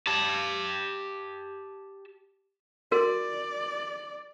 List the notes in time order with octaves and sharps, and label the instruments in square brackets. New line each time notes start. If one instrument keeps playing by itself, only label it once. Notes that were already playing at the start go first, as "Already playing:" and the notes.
[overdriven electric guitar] G4 A5
[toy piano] F#4 A#4 [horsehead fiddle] D5